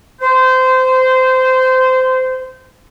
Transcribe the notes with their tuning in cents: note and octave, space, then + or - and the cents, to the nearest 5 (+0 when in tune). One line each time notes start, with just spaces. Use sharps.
C5 -20